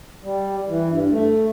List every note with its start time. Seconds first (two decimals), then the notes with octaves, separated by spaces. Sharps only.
0.23 G3
0.68 E3
0.90 G2
1.10 A3